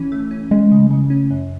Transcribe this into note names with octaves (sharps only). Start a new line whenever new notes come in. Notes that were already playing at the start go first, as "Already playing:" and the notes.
Already playing: E3 C#4
A3
C#4
G#3 C#4
C#3
C#3
C#4
F#2